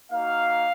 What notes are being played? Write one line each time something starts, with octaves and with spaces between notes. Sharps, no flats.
A#3 D#4 F#4 F5